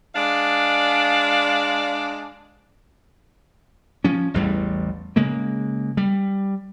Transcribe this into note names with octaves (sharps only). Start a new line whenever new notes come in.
G#3 D4 D5 F5
F3 C#4
A1 E2 G3
C#3 G#3 A#3
G3